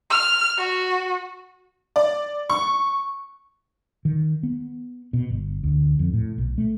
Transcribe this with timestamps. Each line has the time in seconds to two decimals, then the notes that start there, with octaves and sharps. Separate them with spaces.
0.10 F6
0.58 F#4
1.96 D5
2.50 C#6
4.05 D#3
4.43 B3
5.13 B2
5.30 G1
5.63 D2
5.99 F2
6.13 A2
6.38 B1
6.58 A3